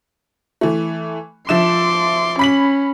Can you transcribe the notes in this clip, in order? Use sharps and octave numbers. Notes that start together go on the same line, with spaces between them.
E3 A3
F3 E5 C6 D6 E7
C#4 B5 B6 F#7